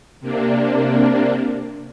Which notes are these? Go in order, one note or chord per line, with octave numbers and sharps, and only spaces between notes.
C3 A#3 D4